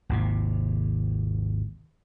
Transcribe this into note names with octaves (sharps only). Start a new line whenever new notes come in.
G#1 D#2 C3